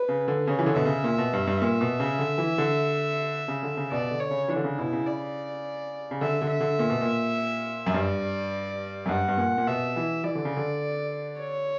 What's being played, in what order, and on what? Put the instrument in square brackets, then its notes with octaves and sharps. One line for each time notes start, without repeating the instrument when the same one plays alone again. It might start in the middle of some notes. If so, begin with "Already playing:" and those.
Already playing: [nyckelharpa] B4
[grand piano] C#3
D3
[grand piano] C#3 [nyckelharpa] C#5
[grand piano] E3
D3
[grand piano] B2 [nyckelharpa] E5
[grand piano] C#3
A#2
B2
G2
G2
[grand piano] A#2 [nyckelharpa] E5
[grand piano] B2
C#3
D3
E3
D3
C#3
D3
C#3
[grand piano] B2 [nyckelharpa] D5
[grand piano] D3
[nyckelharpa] C#5
[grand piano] C#3
[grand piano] E3 [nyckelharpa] D4
[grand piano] D3
C#3
[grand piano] B2 [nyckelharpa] E4
[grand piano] C#3
[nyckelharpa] D5
[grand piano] C#3
[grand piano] D3 [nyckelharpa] E5
[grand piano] D3
[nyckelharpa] E5
[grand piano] D3
A#2
B2
A#2
F#2
[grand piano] G2 [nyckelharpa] D5
[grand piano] F#2
[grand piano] G2 [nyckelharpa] F#5
[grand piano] G2
A#2
A#2
[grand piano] B2 [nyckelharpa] E5
[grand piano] E3
[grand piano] E3 [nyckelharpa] D5
[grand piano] D3
C#3
D3
[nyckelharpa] C#5